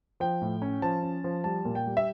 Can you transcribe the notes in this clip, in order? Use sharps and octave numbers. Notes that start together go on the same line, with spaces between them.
F3 G5
A2
C#4
F3 A5
C#4
F3
G3 A5
A#2
G5
G3
E5